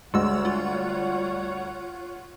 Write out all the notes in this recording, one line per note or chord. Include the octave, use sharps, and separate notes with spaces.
D2 G3 G#3 C#5 F#5 E6
F4